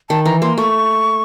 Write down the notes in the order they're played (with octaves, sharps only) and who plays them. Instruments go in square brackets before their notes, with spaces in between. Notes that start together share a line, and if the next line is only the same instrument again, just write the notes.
[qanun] D#3 [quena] A5
[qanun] E3 [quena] A#5
[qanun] A#3 [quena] C6
[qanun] A3 [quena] C#6